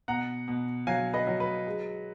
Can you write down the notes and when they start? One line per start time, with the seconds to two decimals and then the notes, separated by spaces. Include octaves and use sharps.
0.08 B2 F#5 A#5
0.48 B2
0.87 F#3 F5 G#5
1.13 B4 D#5
1.27 F#3
1.40 B4
1.67 G#3